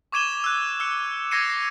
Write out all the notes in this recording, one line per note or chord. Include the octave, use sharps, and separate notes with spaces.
C#6 D6 G#6 D#7 E7 G7
E6 F#6
E6 C#7
D6 G#6 A#6 C7 C#7 D#7
A#6 C7